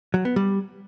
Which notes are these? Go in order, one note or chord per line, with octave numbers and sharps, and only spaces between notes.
F#3
B3
G3